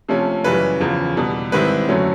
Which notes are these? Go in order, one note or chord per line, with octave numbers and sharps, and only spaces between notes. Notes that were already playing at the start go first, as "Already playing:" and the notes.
C3 F3 A3 C#4
F#2 C#3 E3 G3 B4
E2 C#3 F3
E2 B2 G3
G#2 D#3 G3 C4 E4 B4
F#2 D3 F#3 A3 C#4